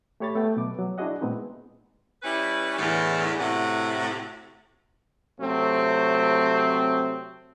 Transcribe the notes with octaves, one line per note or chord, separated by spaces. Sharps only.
A3 G4 C#5 B5 A6
A3 B3 G5
B2 F#3 B4 D6
F#3
D4 E4 F#4 G#4 D#5 F#5
A#2 G#3 B3 C4 D#4
G3 C#4 E4 B4
E2 A2 D3 E3
A2 C3 F#4 F#5
C3 F#3 A3 C4